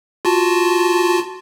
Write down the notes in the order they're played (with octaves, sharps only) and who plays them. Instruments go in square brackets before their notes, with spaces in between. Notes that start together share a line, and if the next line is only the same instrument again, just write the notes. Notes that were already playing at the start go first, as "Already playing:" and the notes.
[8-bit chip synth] F4 F#4 A5